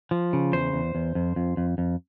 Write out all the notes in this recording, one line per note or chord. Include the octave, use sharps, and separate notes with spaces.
F3
C#3
E2 C5
E2
E2
F2
F2
F2
F2